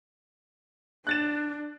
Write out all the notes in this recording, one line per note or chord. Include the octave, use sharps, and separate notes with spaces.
D4 F#6 A6 E7